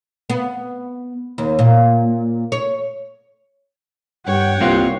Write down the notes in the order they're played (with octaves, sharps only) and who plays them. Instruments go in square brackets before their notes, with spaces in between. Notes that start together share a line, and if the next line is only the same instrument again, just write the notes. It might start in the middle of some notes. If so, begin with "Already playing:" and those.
[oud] B3
D#2
A#2
C#5
[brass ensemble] G2 [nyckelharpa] C#5 [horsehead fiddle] F#5 G5
[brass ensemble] C2 G2 [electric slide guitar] A#3 C4 F4